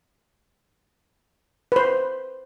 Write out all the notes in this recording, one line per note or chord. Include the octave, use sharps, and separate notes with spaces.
B4 C5